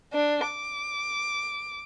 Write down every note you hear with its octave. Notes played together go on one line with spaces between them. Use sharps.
D4
D6